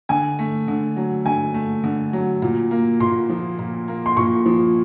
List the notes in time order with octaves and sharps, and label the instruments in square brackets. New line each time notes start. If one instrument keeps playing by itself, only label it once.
[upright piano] D3 G#5
A3
D3
F#3
D3 G#5
A3
D3
F#3
A#2
A#3
A#2 C6
F3
A#2
A#3
C6
A#2 C#6
F3